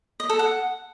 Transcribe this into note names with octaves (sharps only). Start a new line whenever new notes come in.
D#5
A4
F#5